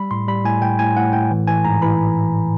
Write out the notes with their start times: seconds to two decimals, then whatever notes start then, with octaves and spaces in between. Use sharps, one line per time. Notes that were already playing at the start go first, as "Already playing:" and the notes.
Already playing: G3 B5
0.11 A2 C6
0.28 G3 B5
0.45 A2 G#5
0.62 A2 G5
0.79 A2 G#5
0.97 A2 F#5
1.13 A2 G5
1.31 E3
1.48 E3 G#5
1.65 G#2 A#5
1.82 E3 B5